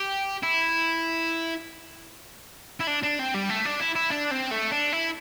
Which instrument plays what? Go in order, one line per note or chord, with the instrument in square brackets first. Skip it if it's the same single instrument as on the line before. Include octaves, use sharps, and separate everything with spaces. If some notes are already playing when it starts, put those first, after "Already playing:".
Already playing: [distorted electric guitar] G4
E4
E4
D4
D4
C4
G3
A3
D4
E4
E4
D4
C4
A3
D4
E4